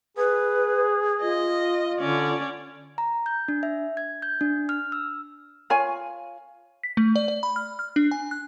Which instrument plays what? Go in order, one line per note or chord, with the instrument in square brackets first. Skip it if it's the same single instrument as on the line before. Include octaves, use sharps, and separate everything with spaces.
[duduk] G#4 [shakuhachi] B4
[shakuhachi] F4 [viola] D#5
[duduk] D3 [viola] C#4 D5
[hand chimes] A#5
G6
D4
E5
G#6
G6
D4
F6
E6
[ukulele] F4 C#5 F5 G#5
[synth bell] B6
A3
D5
D5
B5
F6
F6
D4
G#5
F#6